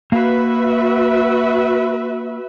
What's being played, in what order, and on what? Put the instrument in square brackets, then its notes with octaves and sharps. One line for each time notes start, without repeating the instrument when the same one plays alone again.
[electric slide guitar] A#3 F5 [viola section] F#4 B4 E5